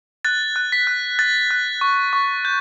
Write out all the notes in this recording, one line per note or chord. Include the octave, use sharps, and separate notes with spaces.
F#6 A6
F#6
B6
F#6
F#6 A6
F#6
C#6
C#6
G6